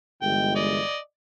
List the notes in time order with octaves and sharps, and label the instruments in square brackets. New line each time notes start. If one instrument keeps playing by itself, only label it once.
[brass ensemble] G1 E3 G#3 [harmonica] G5
[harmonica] D5 D#5